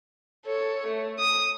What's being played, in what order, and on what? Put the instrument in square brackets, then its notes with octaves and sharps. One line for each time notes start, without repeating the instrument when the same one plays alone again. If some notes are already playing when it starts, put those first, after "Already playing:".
[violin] A4 C#5
A3
D#6